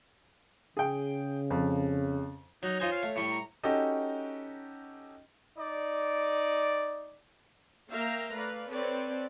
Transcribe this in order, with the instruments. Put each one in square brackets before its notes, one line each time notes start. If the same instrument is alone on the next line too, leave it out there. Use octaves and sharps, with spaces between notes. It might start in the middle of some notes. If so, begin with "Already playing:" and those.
[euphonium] C#3 [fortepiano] G#4 G5
[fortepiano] F2
[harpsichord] F#3 [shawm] D#4 [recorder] C#5
[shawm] D#4 [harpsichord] F4 C5 G#5
[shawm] F5
[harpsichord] A3
[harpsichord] A2 G3 [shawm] C#6
[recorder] A#5
[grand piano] C#4 D#4 F#4 G4 A4 D#5
[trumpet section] D#4 D5
[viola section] A#3 E5 F5 G5 A#5
A3 B4 D5 F5
C4 A4 B4 C#5 D5